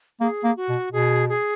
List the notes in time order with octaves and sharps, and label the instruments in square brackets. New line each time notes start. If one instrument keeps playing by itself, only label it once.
[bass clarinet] A#3 [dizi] G#4
[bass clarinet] A#3
[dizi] F#4
[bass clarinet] B2
[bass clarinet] B2 [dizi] G#4
[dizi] G#4